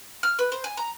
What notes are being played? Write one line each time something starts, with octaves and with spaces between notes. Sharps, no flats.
F6
B4
C5
G#5
A#5